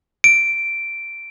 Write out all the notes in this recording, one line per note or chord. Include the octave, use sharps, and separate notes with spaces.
D7